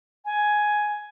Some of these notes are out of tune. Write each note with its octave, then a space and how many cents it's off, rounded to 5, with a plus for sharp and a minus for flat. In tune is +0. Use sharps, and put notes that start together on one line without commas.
G#5 +10